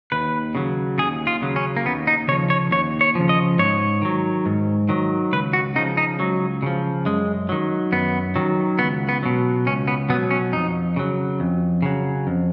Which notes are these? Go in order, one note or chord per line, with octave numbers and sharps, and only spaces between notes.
D#2 B4
C#3 F#3
D#2 G#4
F4
C#3 F#3
C#4
A#3
D#2 B3
D#4
C#3 F3 C#5
C#5
D#2 C#5
C#5
C#3 F3
D#5
G#2 C#5
D#3 F#3
G#2
D#3 F#3
C#2 B4
F#4
C#3 F3 D#4
D#4
C#2 F#3
C#3 F3
F#2 G#3
D#3 F#3
F#2 B3
D#3 F#3
C#2 B3
B3
B2 F#3
C#2 C#4
B3
B2 F#3 B3
C#4
F2 D#4
C#3 F#3
F2
C#3 F#3
F2